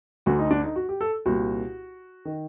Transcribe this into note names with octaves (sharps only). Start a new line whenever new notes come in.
D2 D3 F#4
D#4
D4
D#4
F#4
G4
A4
C2 A#2 F#4
D#3